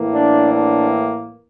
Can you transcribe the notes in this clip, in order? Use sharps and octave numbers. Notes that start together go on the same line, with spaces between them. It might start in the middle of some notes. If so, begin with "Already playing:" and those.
Already playing: A2 E3 A#3
D4
D4